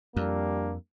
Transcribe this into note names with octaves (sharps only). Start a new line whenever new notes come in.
F2 G3 A#3 D4